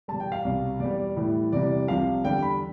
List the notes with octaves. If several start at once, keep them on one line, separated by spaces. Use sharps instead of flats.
E2 B2 G3 A5
G5
F5
C2 B2 G3
E2 B2 G3 D5
A2 E3 G3
E2 C3 E3 G3 D5
C2 C3 F3 F5
E2 D3 G3 G5
B5